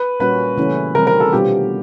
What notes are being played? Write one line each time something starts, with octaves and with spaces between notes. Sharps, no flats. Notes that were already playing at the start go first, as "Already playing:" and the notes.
Already playing: B4
A#2 G3 A#3 C#4 F#4 B4
C#3 E3 A3 C#4 E4
C3 D#3 G3 C4 A#4
A#4
A4
B2 G3 B3 D4 F4 G4